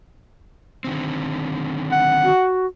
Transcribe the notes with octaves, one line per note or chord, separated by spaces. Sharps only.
D3 D#3 C4
F#5
F#4